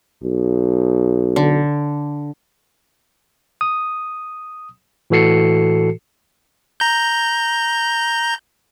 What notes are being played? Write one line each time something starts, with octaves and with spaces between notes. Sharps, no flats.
B1
D3
D#6
A2 E3 F#4 A4 C7 C#7
A#5 G6